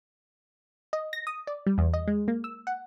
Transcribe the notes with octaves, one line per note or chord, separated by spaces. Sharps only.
D#5
A#6
D#6
D5
G3
E2
D#5
G#3
A#3
E6
F#5